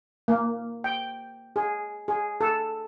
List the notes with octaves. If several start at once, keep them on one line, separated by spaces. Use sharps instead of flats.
A#3
G5
G#4
G#4
A4